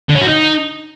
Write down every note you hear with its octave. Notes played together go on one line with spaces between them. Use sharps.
D3
C#4
F#4
D#4